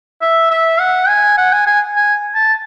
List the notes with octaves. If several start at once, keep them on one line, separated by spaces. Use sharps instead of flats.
E5
E5
F#5
G#5
F#5
G#5
G#5
G#5
A5